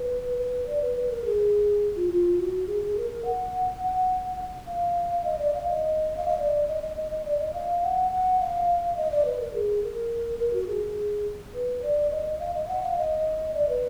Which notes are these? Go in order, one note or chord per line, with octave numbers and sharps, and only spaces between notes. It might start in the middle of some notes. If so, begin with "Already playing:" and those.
Already playing: B4
B4
D5
B4
B4
A#4
G#4
F4
F4
F#4
G#4
G#4
A#4
F#5
F#5
F5
D#5
D5
F5
D#5
F5
D#5
D5
D#5
D#5
D#5
D#5
D5
D#5
F5
F#5
F#5
F5
D#5
D5
B4
A#4
G#4
A#4
A#4
F#4
G#4
B4
D5
D#5
F5
D#5
F#5
F5
D#5
D5
B4